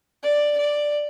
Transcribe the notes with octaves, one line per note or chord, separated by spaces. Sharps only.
D5
D5